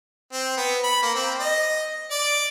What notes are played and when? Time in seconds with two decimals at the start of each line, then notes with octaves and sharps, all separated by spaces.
0.33 C4
0.57 B3
0.84 B5
1.03 A#3
1.15 C4
1.40 D#5
2.11 D5